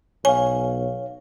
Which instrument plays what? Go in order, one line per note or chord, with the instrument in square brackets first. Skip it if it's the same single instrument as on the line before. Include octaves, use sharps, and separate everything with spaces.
[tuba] B1 [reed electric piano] C#5 F5 [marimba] G#5